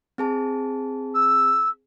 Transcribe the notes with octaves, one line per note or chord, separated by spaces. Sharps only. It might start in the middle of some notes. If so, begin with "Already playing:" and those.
C4 G#4 A5
E6